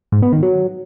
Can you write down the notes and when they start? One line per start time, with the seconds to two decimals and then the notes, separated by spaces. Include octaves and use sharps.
0.12 G#2
0.22 B3
0.32 D#3
0.43 F#3